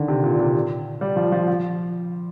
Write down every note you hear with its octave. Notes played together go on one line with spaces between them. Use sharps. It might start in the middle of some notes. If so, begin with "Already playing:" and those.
Already playing: D3 D#3
C3
A#2
C3
G3
F3
F3
F3